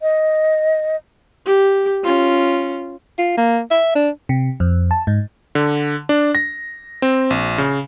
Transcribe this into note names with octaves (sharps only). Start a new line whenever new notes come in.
D#5
G4
C#4 F4
F4
A#3
E5
D4
C3
F2
A5
G#2
D3
D4
A#6
C4
A#1
C#3